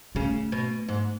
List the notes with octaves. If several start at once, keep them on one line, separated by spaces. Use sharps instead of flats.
C#3 A3
B2
G#2